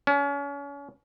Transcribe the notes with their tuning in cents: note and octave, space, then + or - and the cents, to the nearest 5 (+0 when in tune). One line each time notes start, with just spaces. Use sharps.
C#4 +35